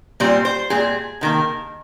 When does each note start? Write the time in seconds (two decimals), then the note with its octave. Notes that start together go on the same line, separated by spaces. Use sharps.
0.20 A#2 G3 C4 C5
0.45 C5
0.70 A#2 G#3 C4 G#4
1.21 C3 D#3 A#3